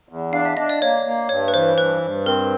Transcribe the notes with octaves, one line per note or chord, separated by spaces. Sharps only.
E2
D4 F5
E5
D4 D#5
D5
A#3 C#5
A#3
G2 C#5
B4
E3 C5
G2 B4
G2
C4 A#4